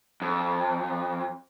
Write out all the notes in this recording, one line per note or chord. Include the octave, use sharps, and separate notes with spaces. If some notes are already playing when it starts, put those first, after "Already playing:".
F2